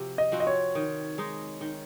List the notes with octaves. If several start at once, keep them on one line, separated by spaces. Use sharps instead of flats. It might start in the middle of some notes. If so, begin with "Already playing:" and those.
Already playing: C3 F3 F#4
D#5
F3 C4 F#4
D#5
C#5
D#3
G#3 D#4
D#3